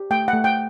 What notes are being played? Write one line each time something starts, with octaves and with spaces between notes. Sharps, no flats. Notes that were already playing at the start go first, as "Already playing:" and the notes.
Already playing: G4
A3 G5
F#5
A3
G5